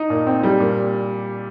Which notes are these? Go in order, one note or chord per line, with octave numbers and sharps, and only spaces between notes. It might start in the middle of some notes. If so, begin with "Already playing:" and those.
Already playing: D#4
A#2
C4
G3
A#2